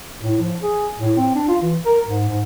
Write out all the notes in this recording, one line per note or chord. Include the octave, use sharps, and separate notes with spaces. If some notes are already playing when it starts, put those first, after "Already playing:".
A2
F3
G#4
A2
C4
D4
F4
E3
A#4
G#2
G#2